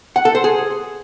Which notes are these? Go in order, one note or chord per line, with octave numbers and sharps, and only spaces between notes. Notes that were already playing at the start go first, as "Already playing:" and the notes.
F#5
A4
C5
G#4